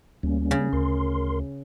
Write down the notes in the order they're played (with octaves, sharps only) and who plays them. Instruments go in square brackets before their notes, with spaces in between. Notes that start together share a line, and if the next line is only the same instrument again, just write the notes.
[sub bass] D2 [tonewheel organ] G3 A#3 C#4
[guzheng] C#3
[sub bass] D2 [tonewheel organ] A#4 C6